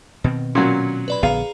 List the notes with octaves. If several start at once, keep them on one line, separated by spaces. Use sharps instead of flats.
B2 D#3 C4
A#2 F#3 C#4
B4 D5 B5
A#1 D3 B3 G#4 F5 A#5